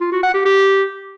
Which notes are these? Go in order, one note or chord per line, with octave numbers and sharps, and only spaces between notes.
F4
F#4
F#5
G4
G4